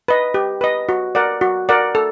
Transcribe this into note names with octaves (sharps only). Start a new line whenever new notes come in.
B4 D#5
G4
B4 D#5
F#4
A#4 D5 F#5
F#4
A#4 D5 F#5
A4